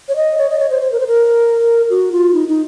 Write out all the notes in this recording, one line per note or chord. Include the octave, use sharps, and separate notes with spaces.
C#5
D#5
C#5
D#5
C#5
C5
C5
A#4
C5
A#4
F#4
F4
D#4
D#4